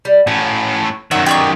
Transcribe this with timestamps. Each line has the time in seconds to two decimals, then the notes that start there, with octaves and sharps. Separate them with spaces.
0.05 G3
0.27 A2 C#4 F#4
1.11 F#2 D#3 D#4 C#5 E5 F#5
1.26 G4 D5 C#6